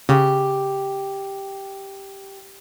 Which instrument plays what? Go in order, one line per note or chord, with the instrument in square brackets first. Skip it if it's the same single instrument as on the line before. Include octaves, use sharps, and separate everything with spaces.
[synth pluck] C#3 [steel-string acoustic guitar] G4